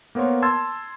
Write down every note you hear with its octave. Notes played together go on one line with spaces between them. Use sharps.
A#3 B3 A#4 C5 C#5
A5 C6 E6 G#6 A6